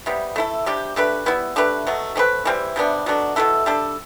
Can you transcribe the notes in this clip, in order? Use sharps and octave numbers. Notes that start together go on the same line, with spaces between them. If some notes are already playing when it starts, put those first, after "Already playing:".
C3 G3 B3
A3 E4 A4
C3 G3 D4 G4
A3 D4 G4 B4
G3 B3 E4
A3 D4 G4 B4
B2 F#3 A3
A3 C4 G4 B4
E3 G3 C4 E4
C3 G3 B3 D4
B2 F#3 A3 D4
B2 A3 E4 A4
G3 D4 A4